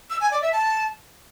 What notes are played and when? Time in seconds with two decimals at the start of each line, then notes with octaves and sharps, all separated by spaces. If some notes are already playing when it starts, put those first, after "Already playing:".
0.10 E6
0.21 G#5
0.31 D5
0.42 E5
0.52 A5